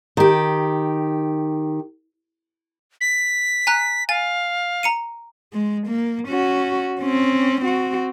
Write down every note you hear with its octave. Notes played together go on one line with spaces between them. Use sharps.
D#3 G4
B6
G#5 A#5 F#6
F5 G#5 A6
A#5 C#7 D#7
G#3
A#3
C#4 F#4
C4 C#4
C4 F#4